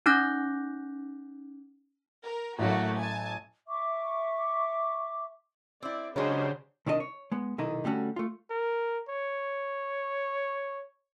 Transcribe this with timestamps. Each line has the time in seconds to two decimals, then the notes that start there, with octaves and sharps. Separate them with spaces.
0.06 C#4 D#4 D6 F#6 G6 A#6
2.24 A#4
2.59 A1 F#3 A3 A#3 F#4
2.98 G#5 A5
3.67 E5 C#6 D6
5.83 C4 E4 D5
6.16 C#3 F#3 G#3 D4 D#4 G4 B4 C5
6.86 C2 D#3 D4 G#4 D#5
7.00 C#5
7.32 G#3 B3
7.58 B1 C3 D#3 D#4 E4 A#5
7.84 D3 G3 A3 C#4 F#4
8.16 A3 F4
8.50 A#4
9.09 C#5